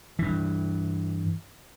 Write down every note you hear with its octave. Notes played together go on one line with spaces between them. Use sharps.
G2 E3